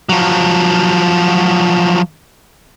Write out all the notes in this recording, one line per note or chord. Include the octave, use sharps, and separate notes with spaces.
F3 F#3